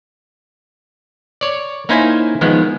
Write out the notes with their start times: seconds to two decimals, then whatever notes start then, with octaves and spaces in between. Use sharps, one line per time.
1.41 C#5 D5
1.89 A#3 C#4 D#4 E4 C5 G#5
2.41 D#3 F3 G#3 B3